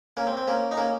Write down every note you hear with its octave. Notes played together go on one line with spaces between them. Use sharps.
A#3 C#4
C4
C4
A#3 C#4
D#4
A#3 C#4